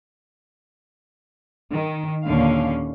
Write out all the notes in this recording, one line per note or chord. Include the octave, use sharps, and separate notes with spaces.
D#3
D#2 A#2 D3 C#4 F5